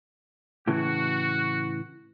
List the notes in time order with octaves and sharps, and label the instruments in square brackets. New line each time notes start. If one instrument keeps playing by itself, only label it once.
[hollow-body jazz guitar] A2 C#3 E3 [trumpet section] F#4